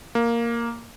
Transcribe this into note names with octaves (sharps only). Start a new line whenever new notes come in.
A#3